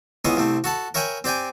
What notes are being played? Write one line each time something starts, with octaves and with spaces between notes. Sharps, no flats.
C#2 B3 C#4 E4 D#5 C6
C2 A3 C4
F#4 A4 A5 B5
A#4 C#5 E5 G5 G#5 B5
C4 G4 D5 G5 G#5